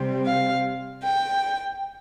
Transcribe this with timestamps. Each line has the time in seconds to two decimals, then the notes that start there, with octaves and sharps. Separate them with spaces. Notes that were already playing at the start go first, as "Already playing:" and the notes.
Already playing: C3 G3 C4
0.26 F5
1.03 G5